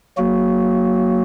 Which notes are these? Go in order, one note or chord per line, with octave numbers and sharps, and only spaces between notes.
F#3 A#3 F#4